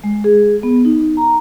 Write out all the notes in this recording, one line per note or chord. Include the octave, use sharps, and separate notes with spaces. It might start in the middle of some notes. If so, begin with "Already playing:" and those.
G#3
G#4
B3
D#4
A#5